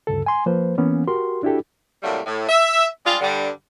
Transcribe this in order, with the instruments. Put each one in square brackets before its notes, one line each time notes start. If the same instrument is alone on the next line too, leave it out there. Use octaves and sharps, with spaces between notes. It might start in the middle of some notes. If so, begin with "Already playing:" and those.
[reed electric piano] D2 G2 C#3 A4
G#5 C6
F3 A#3 B4 C5
E3 A#3 B3 C#4
F#4 G4 A#4 C6
D4 E4 F#4 G4 A4
[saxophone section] A2 C3 F#3 G3 A3 A#3
A2
E5
G3 G#3 D4 F4
G2 D3 G3